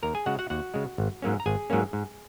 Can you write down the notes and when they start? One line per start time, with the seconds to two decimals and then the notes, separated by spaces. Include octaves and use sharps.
0.03 D#2 A#4 A#5
0.15 G#4 G#5
0.26 C#3 G#3 F#4 F#5
0.39 F#4 F#5
0.50 D#2 F#4 F#5
0.74 C#3 G#3
0.98 G#1
1.22 G#2 F#3 A#3 C#4
1.40 A#5
1.46 G#1 G#4 G#5
1.70 G#2 F#3 A#3 C#4
1.93 G#2